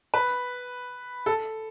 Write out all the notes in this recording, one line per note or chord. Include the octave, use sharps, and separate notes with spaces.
B4
A4